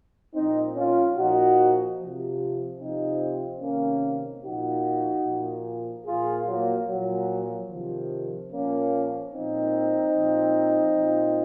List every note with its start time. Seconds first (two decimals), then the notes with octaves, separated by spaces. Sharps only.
0.35 A#2 F3 C4 D#4
0.75 C#4 F4
1.17 A#2 F3 D#4 F#4
1.98 C3 F3
2.80 C3 F3 C4 D#4
3.61 C3 D#3 A#3 C#4
4.43 A#2 F3 D#4 F#4
5.25 A#2 F3
6.06 A#2 F3 F4 G#4
6.47 F#3 A#3
6.88 A#2 F3 F#3
7.70 C3 D#3 F3
8.52 A#2 F3 A#3 C#4
9.33 A#2 F3 C4 D#4
10.15 A#2 F3
10.96 A#2 F3